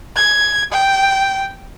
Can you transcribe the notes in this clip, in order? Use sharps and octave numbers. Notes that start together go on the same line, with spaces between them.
G#6
G5